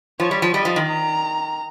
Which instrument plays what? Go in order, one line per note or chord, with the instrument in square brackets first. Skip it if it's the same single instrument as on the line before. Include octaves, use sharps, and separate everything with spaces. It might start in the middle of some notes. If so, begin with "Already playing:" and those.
[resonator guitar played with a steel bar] F3 [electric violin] C#5
[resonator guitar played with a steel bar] G3
F3
[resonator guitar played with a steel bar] G3 [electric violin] D#5
[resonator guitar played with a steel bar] F3
D#3
[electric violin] A#5